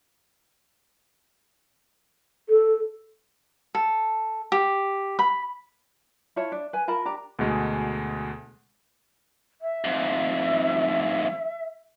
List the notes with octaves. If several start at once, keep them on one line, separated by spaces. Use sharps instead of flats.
A4
A4
G4
B5
E4 F4 C#5 A5
D4
B4 G#5
F4 A#4 A5 B5
D4 G4 A#5
D2 B2 G#3
E5
F2 G#2